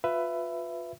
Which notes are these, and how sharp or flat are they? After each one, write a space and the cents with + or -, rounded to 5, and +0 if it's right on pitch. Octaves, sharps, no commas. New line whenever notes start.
F4 +30 B4 +10 E5 +20